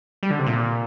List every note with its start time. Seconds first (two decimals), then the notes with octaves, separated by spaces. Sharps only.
0.23 G3
0.30 D3
0.39 C3
0.47 A#2